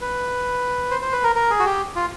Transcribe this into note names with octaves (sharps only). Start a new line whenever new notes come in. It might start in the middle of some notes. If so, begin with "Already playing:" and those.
B4
C5
C5
B4
A#4
A#4
G#4
F#4
G4
F4